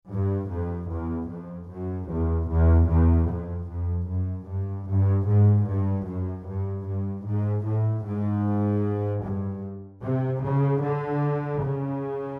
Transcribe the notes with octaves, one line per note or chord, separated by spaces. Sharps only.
G2
F2
E2
F2
F#2
E2
E2
E2
F2
F2
F#2
G2
G2
G#2
G2
F#2
G2
G2
G#2
A2
G#2
G2
C3
C#3
D3
C#3